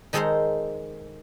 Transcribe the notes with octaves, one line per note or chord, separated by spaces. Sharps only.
D#3 G#3 A4 C5 A#5 C6